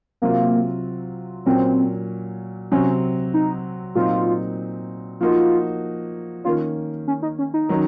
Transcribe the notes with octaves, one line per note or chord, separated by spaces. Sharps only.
C3 F#3 A#3 C4 F4
A#2 F#3 C4 C#4
C3 F#3 C4 C#4
D#4
A#2 F#3 C4 D#4 F4
F3 A#3 D#4 F4 F#4
D#3 A#3 C#4 F4
C#4
D#4
C#4
D#4
D#3 F#3 C#4